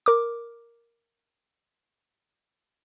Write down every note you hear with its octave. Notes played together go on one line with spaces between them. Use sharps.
A#4 D6